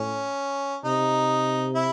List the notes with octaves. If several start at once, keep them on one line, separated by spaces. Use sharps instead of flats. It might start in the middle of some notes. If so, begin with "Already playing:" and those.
Already playing: A2 C#4
C3 D#4
E4